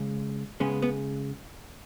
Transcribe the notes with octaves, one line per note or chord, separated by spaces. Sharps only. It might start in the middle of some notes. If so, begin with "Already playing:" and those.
Already playing: C#3 G#3
C#3 G#3 B3 C#4
B3